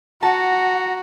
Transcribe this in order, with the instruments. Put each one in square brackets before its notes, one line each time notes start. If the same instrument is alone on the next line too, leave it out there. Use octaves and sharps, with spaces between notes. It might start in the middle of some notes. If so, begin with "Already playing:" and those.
[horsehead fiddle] F#4 [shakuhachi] F#5 [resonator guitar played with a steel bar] A5 [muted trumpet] A#5